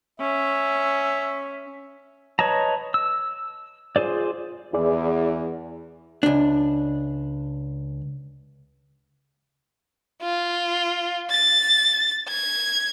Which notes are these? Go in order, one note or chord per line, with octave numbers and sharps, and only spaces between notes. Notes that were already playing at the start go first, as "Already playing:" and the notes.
C#4 E5
B4 C#5 D#5 A5 A#5
E6
F4 G#4 C5 D5
E2 E4 G#4 D5
C#2 D4
F4
A6
G#6